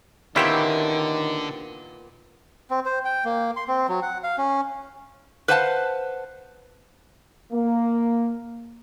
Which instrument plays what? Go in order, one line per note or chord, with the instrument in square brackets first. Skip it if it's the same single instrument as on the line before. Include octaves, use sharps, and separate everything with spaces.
[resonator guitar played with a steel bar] A#2 A#3 B3 [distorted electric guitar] D3 [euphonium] D#3 [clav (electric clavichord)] C#4 E4 G4
[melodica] C4
C5
G5
A#3
C6
C4
F#3
F#5
F5
C#4
[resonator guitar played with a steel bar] B4 C5 F5 F#5 G#5 A5
[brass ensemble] A#3